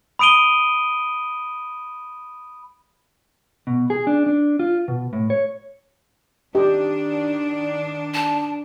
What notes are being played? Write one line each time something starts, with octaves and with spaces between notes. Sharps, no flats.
B5 D#6 D7 D#7 G7
B2
G#4
D4
D4
F4
B2
A2
C#5
D#3 D4 G4 D#5
A5